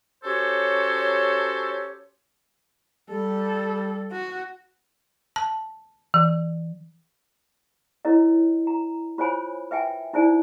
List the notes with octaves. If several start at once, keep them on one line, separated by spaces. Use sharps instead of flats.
C#4 F#4 G4 A4 C5 C#5
G3 A4
F#4
A5
E3
E4 A#4 C#5 D#5
A#5
F4 C5 C#5 G#5 B5
B4 E5 G5 G#5
D#4 E4 C5 D5 G#5